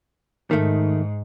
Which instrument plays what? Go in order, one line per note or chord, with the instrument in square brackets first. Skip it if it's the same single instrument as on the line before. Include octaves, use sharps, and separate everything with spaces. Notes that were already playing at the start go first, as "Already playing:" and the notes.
[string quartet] G#2 [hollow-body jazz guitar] D#3 A3